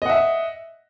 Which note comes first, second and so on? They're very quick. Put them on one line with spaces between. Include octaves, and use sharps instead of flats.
D#5 F#5 E5